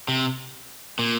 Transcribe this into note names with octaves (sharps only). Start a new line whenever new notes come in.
C3
A#2